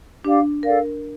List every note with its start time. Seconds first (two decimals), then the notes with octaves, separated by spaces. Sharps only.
0.25 D4 G4 D5 F5
0.63 A4 A#4 D5 F5